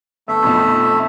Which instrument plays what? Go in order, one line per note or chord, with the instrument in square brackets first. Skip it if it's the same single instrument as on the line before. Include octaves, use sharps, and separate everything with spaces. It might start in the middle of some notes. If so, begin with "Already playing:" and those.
[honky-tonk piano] G1 [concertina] A3 E5
[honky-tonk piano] B1 F2